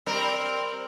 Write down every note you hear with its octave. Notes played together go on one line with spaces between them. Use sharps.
G3 C4 A#4